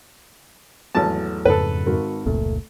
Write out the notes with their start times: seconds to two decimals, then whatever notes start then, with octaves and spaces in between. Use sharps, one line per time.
0.95 G#1 E2 F#3 A3 A5
1.45 F2 G#2 C#3 A4 B4
1.86 G#1 F#4 A#4
2.26 F1 C#2 A#2 A3